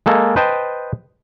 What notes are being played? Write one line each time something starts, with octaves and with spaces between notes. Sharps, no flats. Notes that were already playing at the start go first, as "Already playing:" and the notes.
G#3 A#3 A4
B4 C5 D#5 G5 A5